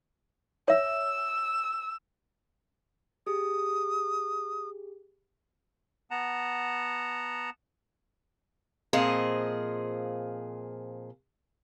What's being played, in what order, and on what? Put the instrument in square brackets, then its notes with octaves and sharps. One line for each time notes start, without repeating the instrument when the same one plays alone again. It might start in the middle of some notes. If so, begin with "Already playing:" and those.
[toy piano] C#5 E5 [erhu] E6
[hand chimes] G4 G#4 [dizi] D#6
[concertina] B3 F#5 A5 A#5
[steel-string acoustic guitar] A#2 F3 C4 G#4 D#5